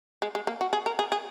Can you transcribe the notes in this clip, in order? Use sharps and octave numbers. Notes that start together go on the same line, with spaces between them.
G#3
G#3
A#3
F#4
G#4
A#4
G#4
G#4